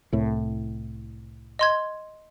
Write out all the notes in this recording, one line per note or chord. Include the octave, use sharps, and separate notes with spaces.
C2 A2
D#5 C6 G#6